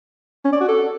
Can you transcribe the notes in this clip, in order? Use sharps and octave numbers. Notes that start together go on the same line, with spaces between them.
C#4
D5
F#4
A4